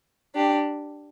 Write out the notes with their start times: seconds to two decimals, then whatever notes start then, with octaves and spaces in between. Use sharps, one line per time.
0.34 D4 G4